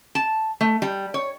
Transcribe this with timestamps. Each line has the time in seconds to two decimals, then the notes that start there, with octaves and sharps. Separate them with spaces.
0.15 A5
0.61 A3
0.82 G3
1.14 C#5